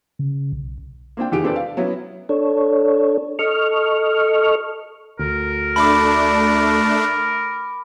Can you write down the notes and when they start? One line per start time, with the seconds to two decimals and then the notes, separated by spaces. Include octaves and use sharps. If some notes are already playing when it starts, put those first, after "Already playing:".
0.19 C#3
0.52 B1
1.17 A#3 C4 D4 G5
1.32 F1 E2 D#3 G4 G#4 D7
1.44 C4 D4 A4 B4 D5 G5
1.56 F5
1.77 F#3 B3 C#4 E4
2.29 D4 A4 C#5
3.39 A4 D#5 C#6 F6
5.19 D2 A#4
5.76 A3 D4 B5 D6